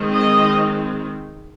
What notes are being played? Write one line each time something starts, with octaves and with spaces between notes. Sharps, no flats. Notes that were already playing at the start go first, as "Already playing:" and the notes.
Already playing: D#3 G#3 C4
D#5